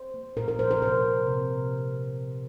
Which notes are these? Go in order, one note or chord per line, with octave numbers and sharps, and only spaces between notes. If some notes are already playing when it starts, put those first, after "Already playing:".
Already playing: C5
A#3
A#2 A#4
A#4
F3 C5
A#4
C3 C5
C3
C3